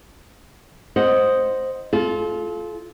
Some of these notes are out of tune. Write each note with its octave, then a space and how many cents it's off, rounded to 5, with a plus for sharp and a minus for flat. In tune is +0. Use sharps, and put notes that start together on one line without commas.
C5 +0 D#5 +0 F#5 +0
F4 +0 A4 -40